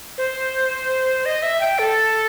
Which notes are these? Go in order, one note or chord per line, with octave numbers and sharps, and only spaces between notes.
C5
D#5
E5
G5
A4